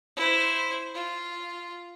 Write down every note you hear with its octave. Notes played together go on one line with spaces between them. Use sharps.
E4 C5
F4